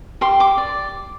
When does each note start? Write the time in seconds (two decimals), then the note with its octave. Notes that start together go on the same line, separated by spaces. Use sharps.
0.21 G4 C6
0.40 D6
0.58 D5